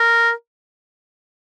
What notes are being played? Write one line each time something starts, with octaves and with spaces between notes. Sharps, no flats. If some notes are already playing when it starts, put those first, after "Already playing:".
Already playing: A#4